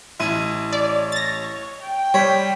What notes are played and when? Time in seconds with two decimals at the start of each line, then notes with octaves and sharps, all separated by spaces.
0.20 A1 E4 D#7
0.73 C#5 D5
1.12 A6 A#6
1.81 G5
2.14 G3 C#5 B5